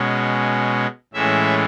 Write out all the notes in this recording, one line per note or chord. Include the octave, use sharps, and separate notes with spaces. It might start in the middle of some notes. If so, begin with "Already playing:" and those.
Already playing: B2 G#3 C#4
A2 E3 G#3 C#4 E5